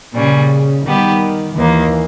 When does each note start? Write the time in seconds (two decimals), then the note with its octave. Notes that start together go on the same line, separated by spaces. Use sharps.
0.14 A#2 C#3 G3 C#4
0.86 D#3 G3 B3 G4
1.57 D#2 D#3 E3 A#3